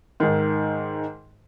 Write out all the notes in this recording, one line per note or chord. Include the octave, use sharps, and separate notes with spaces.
G#2 D#3